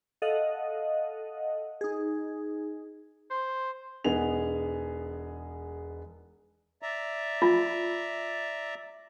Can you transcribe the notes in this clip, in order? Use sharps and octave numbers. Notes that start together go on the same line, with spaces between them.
A4 D#5 F5 F#5
D#4 G#4
C5
E1 B3 D#4 G#4 F7
D5 E5 A#5
F4